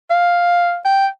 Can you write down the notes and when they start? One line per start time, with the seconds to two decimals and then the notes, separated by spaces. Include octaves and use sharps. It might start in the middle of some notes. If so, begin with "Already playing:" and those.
0.10 F5
0.85 G5